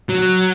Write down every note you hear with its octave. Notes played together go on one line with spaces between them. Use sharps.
F#3